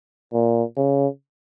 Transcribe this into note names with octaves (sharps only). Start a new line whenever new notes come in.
A#2
C#3